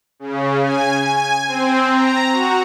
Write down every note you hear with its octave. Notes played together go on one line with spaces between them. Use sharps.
C#3
G#5
G#5
C4
A#5
F#4